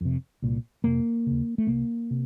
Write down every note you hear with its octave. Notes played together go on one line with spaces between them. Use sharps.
F2 C3
C2 A#2
F2 C3 A#3
D#2 C#3
A3
C2 C3 A#3
C3